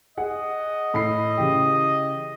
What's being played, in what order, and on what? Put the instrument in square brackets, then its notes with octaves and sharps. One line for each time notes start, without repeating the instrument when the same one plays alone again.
[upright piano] G#4 F#5 [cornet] D#5
[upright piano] A2 B5 C7
C#3 E3 G4